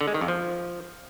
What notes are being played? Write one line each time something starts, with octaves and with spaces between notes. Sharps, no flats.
D3
G#3
D#3
F2
F3